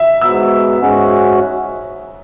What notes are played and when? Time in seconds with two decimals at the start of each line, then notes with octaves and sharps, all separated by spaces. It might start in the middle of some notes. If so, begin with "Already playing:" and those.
Already playing: E5
0.21 G#2 F#3 B3 E6
0.81 G#2 G#3 C#4 F#4